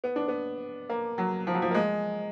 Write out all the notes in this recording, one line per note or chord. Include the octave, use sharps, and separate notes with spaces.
B3
D4
B3
A#3
F#3
F3
F#3
F3
A#3
G#3